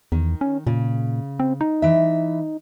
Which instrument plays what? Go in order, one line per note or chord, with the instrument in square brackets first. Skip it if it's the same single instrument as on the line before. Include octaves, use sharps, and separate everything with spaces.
[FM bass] E2 [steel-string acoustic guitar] D#3
[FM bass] C#4
[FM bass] A#2 [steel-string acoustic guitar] C#3
[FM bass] C4
D#4
[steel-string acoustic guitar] E3 E5